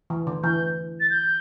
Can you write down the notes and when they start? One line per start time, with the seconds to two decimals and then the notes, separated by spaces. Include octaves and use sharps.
0.10 E3
0.27 D3
0.43 E3 G6
1.00 A6
1.10 G6